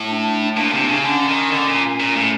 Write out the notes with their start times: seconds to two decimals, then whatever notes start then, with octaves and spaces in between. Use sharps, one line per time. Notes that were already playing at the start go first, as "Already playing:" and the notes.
Already playing: A2
0.10 D4
0.57 A#2 D4
0.73 C3
0.89 C#3
1.04 D3 C#4
1.28 D#3
1.52 D3
1.68 A#2
2.00 A#2
2.16 A2